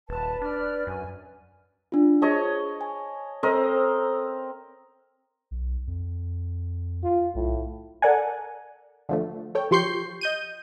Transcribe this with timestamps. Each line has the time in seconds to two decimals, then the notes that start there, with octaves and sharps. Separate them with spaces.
0.09 D#1 B4 A5
0.42 D4 D5 F6
0.87 F#2 G#5
1.92 D4 F4
2.22 G#4 C#5 D#5 A5
2.81 G#5
3.43 C4 A4 A#4 D#5
5.51 B1
5.87 F2
7.03 F4
7.35 B1 A2
8.02 A4 A#4 D5 F#5 G#5
9.09 D3 F3 A3
9.55 A4 C#5 G5
9.71 F3 G4 C6 C#6 G6 C7
10.21 D#5 G6 D#7